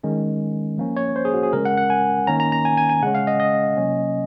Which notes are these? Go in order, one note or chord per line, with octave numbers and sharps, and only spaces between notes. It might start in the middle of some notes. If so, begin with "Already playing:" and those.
D#3 G#3 C#4
F3 A#3 C#4
C#5
C5
G#4
F#4
G#4
C#3 G#3 C#4 A#4
F#5
F#5
G#5
D#3 A#3 C#4 A#5
A#5
A#5
G#5
G#5
G#5
C#3 G#3 C#4 F#5
F5
D#5
D#5
C3 F#3 A#3 C#4